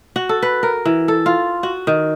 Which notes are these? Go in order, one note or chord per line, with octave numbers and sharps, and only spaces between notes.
F#4
A4
B4
A#4
E3
A4
F4
F#4
D#3